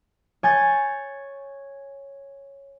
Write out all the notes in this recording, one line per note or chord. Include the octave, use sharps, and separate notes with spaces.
C#5 G#5 G6 A6